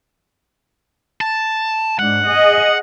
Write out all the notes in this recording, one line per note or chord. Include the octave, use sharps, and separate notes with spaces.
A5
G#2 D4 F#5
G#4 D#5